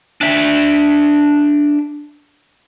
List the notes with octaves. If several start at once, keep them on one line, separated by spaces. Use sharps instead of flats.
D4 E5